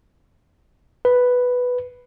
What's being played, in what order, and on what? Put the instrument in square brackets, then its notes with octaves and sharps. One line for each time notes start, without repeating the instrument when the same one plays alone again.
[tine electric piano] B4